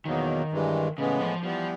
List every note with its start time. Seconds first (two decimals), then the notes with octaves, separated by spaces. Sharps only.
0.05 E2 B2 D#3 F#3 A#3
0.51 G2 E3 G#3
0.98 A2 C#3 E3 G#3 B3
1.21 F3
1.43 E3 F3 G3 B3